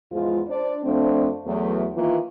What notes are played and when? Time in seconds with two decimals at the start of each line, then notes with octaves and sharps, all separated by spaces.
0.10 E2 G#2 F3 G#3 F4
0.48 D4 C5 D5
0.84 F2 F3 A3 C4 D4
1.46 E2 F#3 A3
1.95 D#3 E3 A#3 F4